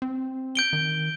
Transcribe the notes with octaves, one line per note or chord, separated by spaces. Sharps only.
C4
G6 D7 G7
D#3